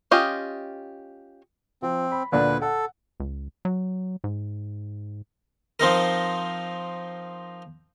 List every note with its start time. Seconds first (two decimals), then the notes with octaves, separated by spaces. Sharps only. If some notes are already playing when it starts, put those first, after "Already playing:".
0.11 C#4 F4 G4 D#5
1.82 F3 C4
2.12 B5
2.32 D2 A#2 D4 B4
2.62 A4 F#5
3.20 C#2
3.65 F#3
4.24 G#2
5.80 F3 C4 D#4 A#4